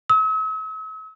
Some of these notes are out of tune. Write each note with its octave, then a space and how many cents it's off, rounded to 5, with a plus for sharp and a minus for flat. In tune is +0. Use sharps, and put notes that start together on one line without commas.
E6 -45